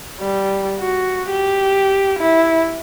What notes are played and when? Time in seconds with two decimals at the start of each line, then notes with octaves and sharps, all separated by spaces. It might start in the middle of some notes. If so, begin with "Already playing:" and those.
0.20 G3
0.80 F#4
1.30 G4
2.19 E4